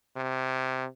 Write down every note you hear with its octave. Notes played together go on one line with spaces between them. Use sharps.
C3